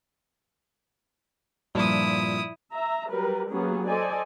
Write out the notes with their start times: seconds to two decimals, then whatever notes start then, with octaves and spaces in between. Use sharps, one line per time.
1.75 G2 A#2 F3 E4 D#6
2.72 E5 A#5
3.10 F#3 G3 A#4 B4
3.51 F#3 A#3 B3 C#4 G4 G#4
3.89 A4 C5 D5 D#5 G#5